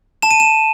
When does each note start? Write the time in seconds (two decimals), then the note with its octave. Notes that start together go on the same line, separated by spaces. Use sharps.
0.22 A5 E7
0.31 D#7
0.40 E7